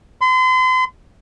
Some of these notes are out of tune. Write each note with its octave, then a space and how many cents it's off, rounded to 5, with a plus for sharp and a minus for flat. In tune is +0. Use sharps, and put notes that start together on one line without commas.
C6 -40